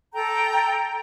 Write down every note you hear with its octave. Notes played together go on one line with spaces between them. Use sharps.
A4 G5 A#5 G6